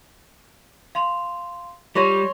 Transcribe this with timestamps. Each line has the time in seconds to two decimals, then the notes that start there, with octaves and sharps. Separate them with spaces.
0.95 F5 C6 F7
1.95 G3 F4 C#5 C6 A#6 D#7